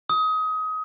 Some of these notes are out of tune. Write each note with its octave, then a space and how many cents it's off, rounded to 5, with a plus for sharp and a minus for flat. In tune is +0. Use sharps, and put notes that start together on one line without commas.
D#6 +25